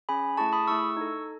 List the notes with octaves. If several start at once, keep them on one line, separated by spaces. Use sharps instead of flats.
C#4 G#4 G#5 B5
A3 E4 G#4 A5 C#6
B5 D#6
A3 E4 G#4 C#6 E6
D#4 A4